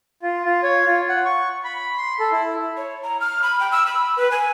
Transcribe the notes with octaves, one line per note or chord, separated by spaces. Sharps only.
F4
F4
C#5
F4
F#5
C#6
B5
C6
A4
E4
C#5
A#5
F6
B5
G5
E6
B5
B4
G#5